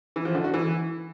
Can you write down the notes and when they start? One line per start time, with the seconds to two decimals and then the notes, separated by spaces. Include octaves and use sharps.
0.16 E3
0.25 F3
0.35 D3
0.44 F#4
0.54 E3